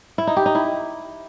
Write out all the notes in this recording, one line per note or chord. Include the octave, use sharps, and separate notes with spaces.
E4
D#4
G4
D#4
E4